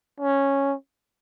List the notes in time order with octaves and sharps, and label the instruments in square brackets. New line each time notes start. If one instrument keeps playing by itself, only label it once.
[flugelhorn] C#4